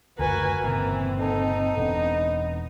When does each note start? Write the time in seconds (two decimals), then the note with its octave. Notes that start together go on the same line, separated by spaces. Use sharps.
0.19 F#1 D2 F#4 A#4 B4 G#5
0.64 G1 A#2 C#3 E3 C4
1.20 D#4 A4
1.77 E1 B3 D4